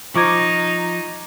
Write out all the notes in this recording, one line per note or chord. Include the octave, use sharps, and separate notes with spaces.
F3 D#4 C#6 D6 G#6